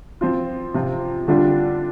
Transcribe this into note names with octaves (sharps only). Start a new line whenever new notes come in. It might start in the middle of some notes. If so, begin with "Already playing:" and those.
F3 C4 F4
C3 F3 C4 F4
D3 G3 D4 F4